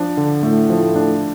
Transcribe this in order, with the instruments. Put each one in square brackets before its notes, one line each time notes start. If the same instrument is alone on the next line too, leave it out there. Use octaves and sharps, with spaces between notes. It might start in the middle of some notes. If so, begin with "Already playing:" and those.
Already playing: [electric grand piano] F3 D4
D3
[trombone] A2 [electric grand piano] A3
[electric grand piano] F3
D4